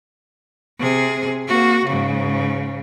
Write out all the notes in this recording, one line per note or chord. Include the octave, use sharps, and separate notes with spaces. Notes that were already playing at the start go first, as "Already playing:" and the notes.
C3 G#4
A#3 F#4
G#2 C#3